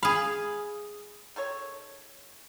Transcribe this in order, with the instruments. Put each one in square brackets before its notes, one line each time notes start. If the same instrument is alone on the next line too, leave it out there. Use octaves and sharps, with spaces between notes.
[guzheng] G#4 F5 [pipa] B5
[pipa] D#3 A4 C#5